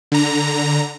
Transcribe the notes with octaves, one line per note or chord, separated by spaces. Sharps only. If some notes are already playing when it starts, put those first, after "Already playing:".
D3 A#5